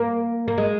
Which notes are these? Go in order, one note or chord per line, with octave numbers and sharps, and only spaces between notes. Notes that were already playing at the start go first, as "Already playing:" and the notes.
Already playing: A#3
A#3
G#3